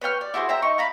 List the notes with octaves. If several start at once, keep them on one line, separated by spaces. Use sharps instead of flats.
B4 C#5 G5 F6
D5
E4 F#4 G#4 C5
C5 E5 G5 A#5
D#4 C#6
F5 A#5 B5